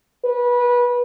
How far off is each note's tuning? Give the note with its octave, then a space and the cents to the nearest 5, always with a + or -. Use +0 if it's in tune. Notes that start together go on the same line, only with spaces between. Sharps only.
B4 -25